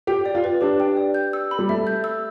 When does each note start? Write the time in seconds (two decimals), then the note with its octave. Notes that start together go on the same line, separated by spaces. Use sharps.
0.07 G4 G5
0.26 D5
0.35 F4
0.44 B4
0.61 D4 G4
0.80 G5
0.97 D5
1.14 G6
1.33 E6
1.51 B5
1.58 G3
1.69 A3 E5
1.87 G6
2.04 E6